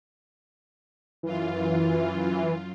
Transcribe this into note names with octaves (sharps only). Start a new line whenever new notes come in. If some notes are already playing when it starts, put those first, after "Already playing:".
F#2 E3 F4